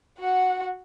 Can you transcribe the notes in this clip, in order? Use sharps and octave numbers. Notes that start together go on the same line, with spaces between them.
F#4 F#5